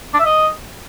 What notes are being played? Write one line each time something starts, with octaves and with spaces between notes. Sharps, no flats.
D4
E5
D#5